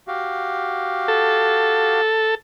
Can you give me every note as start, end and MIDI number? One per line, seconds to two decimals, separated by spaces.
0.08 2.01 66
0.08 2.01 67
0.08 2.01 77
1.08 2.35 69